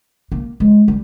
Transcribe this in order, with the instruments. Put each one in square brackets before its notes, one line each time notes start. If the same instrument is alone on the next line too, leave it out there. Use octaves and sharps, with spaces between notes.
[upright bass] A#3
G#3
G3